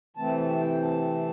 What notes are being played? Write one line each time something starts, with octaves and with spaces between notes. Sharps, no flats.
C3 E3 A3 C4 A5
A5
G5
A5